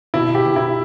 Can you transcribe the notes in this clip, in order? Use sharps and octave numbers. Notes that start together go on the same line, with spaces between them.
B2 E4
G4
B2
E4